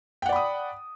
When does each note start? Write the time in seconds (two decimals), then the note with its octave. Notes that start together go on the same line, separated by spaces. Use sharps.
0.22 G5
0.26 F#5
0.29 D5
0.32 B5
0.36 D#6